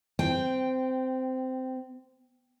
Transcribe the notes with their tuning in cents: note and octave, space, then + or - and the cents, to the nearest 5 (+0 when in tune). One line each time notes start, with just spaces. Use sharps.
C4 -15 G5 +0